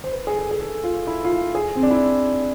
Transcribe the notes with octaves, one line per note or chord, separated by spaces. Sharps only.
C5
B4
G#4
A4
G#4
A4
F4
E4
F4
E4
G#4
C4
D4
E4